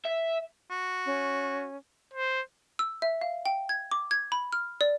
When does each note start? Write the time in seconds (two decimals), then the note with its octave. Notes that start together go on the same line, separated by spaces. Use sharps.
0.05 E5
0.70 F#4
1.06 C#4
2.14 C5
2.79 E6
3.02 E5
3.21 F5
3.46 G5
3.69 G#6
3.91 D6
4.11 G#6
4.32 B5
4.53 F6
4.81 D5